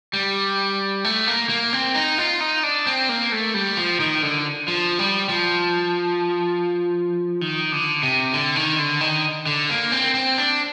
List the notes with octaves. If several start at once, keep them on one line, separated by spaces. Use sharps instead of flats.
G3
A3
A#3
A#3
C4
D#4
F4
D#4
D4
C4
A#3
A3
G3
F3
D#3
D3
F3
G3
F3
D#3
D3
C3
D3
D#3
D3
D#3
D3
A#3
C4
C4
D4